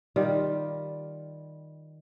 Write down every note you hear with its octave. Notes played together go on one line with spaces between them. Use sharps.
D#3 G3 F4